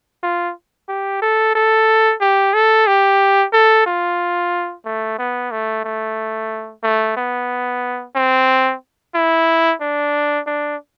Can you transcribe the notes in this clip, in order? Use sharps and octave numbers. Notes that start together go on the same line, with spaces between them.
F4
G4
A4
A4
G4
A4
G4
A4
F4
A3
B3
A3
A3
A3
B3
C4
E4
D4
D4